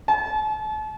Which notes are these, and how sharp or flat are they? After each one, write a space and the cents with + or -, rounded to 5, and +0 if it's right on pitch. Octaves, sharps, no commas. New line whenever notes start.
A5 -40